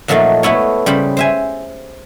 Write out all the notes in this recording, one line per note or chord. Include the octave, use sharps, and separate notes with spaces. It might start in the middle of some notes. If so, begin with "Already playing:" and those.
A#2 F3 F#3 A3 A#3 D#4
A3 B3 E4 C#5
C#3 G3 C5 B5
C5 E5 G#5